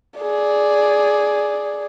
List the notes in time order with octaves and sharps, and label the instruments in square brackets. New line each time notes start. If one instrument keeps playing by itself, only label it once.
[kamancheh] G#4 D5